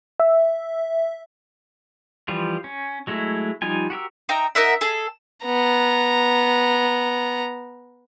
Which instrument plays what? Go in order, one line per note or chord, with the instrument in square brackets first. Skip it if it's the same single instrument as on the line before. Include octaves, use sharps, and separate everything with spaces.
[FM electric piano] E5
[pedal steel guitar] E3 F3 G3 F4
C#4
F#3 G#3 A3 E4
F3 G3 D#4 F4 G#5
F#4 G4 A#4 E6
[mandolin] D#4 E5 G5 A#5
D#4 A#4 E5 F#5
G#4 A4
[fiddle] B3 A#5